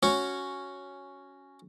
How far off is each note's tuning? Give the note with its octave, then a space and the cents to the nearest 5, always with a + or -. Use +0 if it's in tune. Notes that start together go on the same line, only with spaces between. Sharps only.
C#4 +0 F#4 +0 C#5 +0